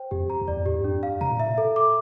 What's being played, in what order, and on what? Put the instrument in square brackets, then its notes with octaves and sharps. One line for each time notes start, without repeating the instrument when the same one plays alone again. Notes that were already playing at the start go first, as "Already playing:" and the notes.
Already playing: [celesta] C5 G5
[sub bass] F2 [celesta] G4
[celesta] A#5
[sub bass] F2
[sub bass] E2 [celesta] D5
[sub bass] A2 [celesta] G4
[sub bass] G2
[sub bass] F2 [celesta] D4
[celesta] F5
[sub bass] C3 [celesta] A#5
[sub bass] A#2
[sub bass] A2 [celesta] E5
[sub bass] A#2
[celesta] A4
D6